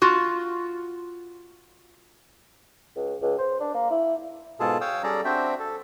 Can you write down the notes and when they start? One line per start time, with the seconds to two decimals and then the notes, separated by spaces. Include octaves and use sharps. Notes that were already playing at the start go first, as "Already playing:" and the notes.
0.02 F4 F#4
2.96 C#2
3.22 C#2
3.38 C5
3.60 D4
3.74 A#3
3.91 E4
4.60 G#2 B2 F4 G#4 A4 A5
4.81 C#5 F5 G5 D#6 E6
5.03 G3 C#4 G#4 A4 D5 A#5
5.25 C4 D4 F#4 C5 E5 G5
5.59 A4